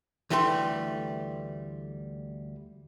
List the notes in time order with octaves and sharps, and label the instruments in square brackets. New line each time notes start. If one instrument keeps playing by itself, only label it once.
[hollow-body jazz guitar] D2 E3 G3 A3 B5 C6